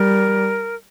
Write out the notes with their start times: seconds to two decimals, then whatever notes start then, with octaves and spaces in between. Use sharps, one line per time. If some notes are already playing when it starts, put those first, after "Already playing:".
Already playing: G3 A#4